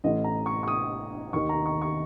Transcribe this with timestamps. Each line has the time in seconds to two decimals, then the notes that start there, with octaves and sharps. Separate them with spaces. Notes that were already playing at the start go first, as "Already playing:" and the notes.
0.04 A1 A2 D#5
0.24 A#5
0.46 C#6
0.63 C#6
0.68 D#6
1.33 D#2 D#3 C#6
1.49 A#5
1.66 C#6
1.82 C#6